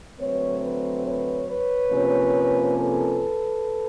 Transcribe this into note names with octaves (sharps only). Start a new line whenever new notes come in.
D3 F#3 A3 C4 B4 C#5
B4 C#5
B4 C#5
B4 C#5
C3 F3 A#3 C#4
A4 B4